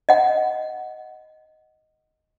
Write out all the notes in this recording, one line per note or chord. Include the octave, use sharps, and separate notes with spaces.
D#5 F#5